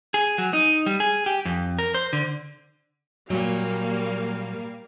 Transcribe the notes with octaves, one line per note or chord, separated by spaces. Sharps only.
G#4
F#3
D#4
G3
G#4
G4
F2
A#4
C5
D3
A#2 F#3 G3 A#3 F5